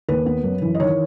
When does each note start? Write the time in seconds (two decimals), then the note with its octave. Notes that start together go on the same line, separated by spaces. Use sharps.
0.09 D#2 B4
0.26 B3
0.44 F#2
0.62 E3
0.75 D#5
0.80 D#3 C#5